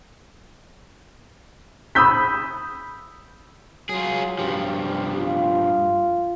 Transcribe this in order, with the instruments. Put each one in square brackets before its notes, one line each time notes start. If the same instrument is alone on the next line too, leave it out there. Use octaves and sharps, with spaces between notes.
[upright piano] B5 D#6 E6 G6 B6
[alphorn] F#3 [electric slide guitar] F4 G#4
[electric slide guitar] G2 F3 [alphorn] G4
[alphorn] F4